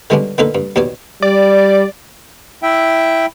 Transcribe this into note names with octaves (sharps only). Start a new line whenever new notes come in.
D3 G3 G#3 B3 C#4 D4
D3 A#3 D#4 F4 A4 B4
G2
D#2 B2 G4 C#5 D5
G3 D5
E4 E5 G5